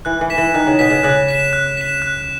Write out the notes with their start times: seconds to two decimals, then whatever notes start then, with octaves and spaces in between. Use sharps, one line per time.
0.05 E3 F#6
0.21 E3
0.30 B6 E7
0.38 E3
0.54 D#3 F#6
0.67 C#3
0.79 B2 B6 E7
0.91 C#3
1.03 C#3 F#6
1.28 B6 E7
1.53 F#6
1.77 B6 E7
2.02 F#6